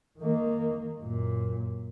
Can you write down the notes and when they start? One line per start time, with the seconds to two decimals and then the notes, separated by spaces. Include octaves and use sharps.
0.19 D#3 A#3
0.99 F#2 A#2